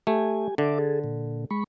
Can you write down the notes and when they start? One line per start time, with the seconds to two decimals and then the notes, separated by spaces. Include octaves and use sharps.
0.07 A3 G4 G#5
0.58 D3 E5 D6
0.78 G#4 A4
1.04 A#2
1.51 G#3 B5 C#6